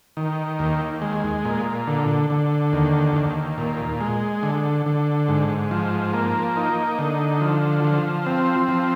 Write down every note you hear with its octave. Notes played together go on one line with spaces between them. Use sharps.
D#3
D#2
G#3
A#2
D3
D3
D#2
D#2
A#2
G#3
D3
D3
G#2
F3
A#3
D#4
D3
F3
F3
C4
F3